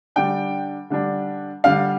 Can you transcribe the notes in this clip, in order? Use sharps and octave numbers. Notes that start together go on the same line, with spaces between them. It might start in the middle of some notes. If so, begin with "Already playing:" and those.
D3 G3 D4 G5
D3 G3 D4
D3 G3 D4 F5